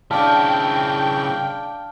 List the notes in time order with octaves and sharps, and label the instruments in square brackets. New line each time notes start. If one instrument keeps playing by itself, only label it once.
[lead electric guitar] C#3 E4 [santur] D4 F5 [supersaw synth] G5 [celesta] A5